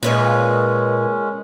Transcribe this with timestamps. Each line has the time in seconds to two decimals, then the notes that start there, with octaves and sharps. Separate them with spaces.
0.03 A#2 G#3 C#4 B4 C#5 D#5